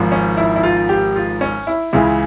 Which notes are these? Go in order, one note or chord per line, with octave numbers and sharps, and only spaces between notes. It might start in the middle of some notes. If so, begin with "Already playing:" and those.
Already playing: G#1 G#2 F3
C#4
E4
E4
F4
G4
F4
C#4
E4
C#2 C#3 E3 E4